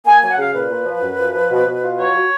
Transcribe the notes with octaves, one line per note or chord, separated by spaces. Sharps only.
A#3 G#5
F#3 G#5
F#5
C#3 F5
A#2 B4
A#2
F3
F#2
F3
F3
B2
B2
F4
F#3 C#5
F#3